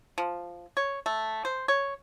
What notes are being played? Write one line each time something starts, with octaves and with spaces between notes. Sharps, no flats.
F3
C#5
A3
C5
C#5